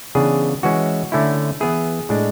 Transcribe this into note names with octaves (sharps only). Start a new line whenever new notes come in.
C#3 E3 B3 D4 G#4
E3 G#3 C#4 F#4
D3 A3 C#4 E4
E3 B3 E4 G#4
A2 G#3 D4